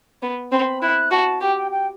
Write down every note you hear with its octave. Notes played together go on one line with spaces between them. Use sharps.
B3
C4 B5
E4 F#6
F#4 A5
G4 G5
G5
G5